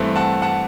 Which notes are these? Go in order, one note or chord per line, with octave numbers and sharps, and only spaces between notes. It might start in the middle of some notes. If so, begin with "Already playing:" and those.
Already playing: G2 E3 A3 C4
F#5 A5
F#5 A5